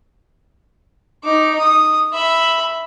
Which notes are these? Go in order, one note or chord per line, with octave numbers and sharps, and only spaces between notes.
D#4 D6
D#6
E5 B5